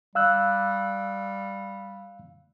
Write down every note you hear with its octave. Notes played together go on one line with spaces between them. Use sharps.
G3 F5 E6 F#6